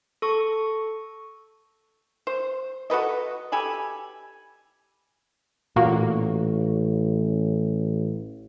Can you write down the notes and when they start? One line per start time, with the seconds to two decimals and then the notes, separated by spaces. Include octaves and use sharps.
0.22 A4 C#6
2.27 C5
2.90 F#4 A4 B4 D#5
3.52 G4 A4 G#5 B5
5.76 A1 A#2 A#3 F#4